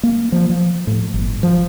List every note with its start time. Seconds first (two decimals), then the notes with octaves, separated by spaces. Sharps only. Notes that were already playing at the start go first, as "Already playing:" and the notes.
0.03 A#3
0.32 F3
0.49 F3
0.87 A2
1.14 G1
1.43 F3